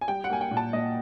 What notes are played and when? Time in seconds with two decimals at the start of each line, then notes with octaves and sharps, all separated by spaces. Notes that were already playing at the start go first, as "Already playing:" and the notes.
0.01 G#5
0.08 G3 G5
0.24 F#5
0.30 A#3 G#5
0.41 G5
0.51 A#2
0.57 A5
0.73 A#2 D#5